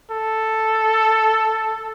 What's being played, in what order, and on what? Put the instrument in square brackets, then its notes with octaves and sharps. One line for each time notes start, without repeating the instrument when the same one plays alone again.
[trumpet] A4